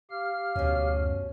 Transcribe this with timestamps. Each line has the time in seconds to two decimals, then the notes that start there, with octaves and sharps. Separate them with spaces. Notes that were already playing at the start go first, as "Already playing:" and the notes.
0.11 G4 F5 F6
0.56 D2 B2 C#4
0.89 F#2